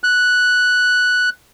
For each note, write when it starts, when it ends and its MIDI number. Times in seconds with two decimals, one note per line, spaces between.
0.04 1.29 90